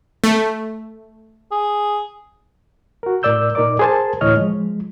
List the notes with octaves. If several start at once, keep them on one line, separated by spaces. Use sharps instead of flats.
A3
G#4
F#4 A#4
A2 A#4 D5 E6 G6
A#2 D#4 A#4 D5 D6
G#4 A#4 C5 G#5 A5
D2 A2 E3 C#5 D#5 F6
F3 G#3